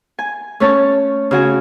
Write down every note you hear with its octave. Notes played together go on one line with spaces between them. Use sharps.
G#5
A3 C#4 C#5 A5
C#3 F#4 G#5